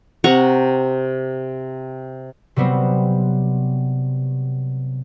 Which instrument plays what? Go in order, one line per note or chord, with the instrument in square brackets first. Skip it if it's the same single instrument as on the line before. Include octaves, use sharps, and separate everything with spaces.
[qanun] C3 F#5 A#5 C#6
[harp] C3 F#3 G3 B3 C4